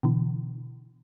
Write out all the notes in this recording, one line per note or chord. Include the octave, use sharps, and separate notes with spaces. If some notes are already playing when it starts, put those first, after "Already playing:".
B2 D3 E3